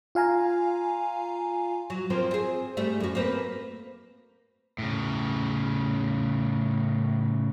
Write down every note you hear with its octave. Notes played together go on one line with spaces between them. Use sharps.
F4 F5 G#5 A#5
F#3
F3 A#3 C4
C4 G#4
G#2 G3 A3
F#2 F#4
A#3 C4 B4
A2 C#3